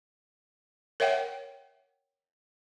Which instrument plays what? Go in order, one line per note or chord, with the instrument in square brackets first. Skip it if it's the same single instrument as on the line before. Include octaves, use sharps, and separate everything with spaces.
[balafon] A#4 C#5 E5 F#5 G5